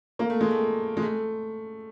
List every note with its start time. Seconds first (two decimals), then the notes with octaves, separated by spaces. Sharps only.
0.19 A#3
0.30 A3
0.41 G#3
0.51 A3
0.97 G#3
1.02 A3